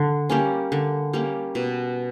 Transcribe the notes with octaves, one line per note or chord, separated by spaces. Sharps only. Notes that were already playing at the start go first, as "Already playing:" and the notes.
Already playing: D3
G3 A#3 C#4
D3
G3 A#3 C#4
B2